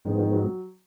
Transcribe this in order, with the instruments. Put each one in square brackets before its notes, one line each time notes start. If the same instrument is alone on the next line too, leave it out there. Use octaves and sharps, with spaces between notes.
[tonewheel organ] G#2 F3 G#3 B3 [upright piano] D#3
[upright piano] D#3
F#3